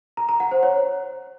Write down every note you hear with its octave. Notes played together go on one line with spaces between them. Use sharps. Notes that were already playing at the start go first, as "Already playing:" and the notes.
A#5
A#5
F#5
C5
C#5